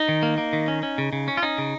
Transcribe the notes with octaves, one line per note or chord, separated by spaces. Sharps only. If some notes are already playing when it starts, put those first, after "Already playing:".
Already playing: D#4
D#3
A#3
A#3
D#3
C#4
C#4
C#3
C#3
C#4
F4
C#4 D#4
C#3